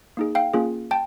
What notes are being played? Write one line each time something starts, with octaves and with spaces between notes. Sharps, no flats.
A#3 D#4 G#4
F5 G5
A#3 C#4 F4 G#4
G5 A5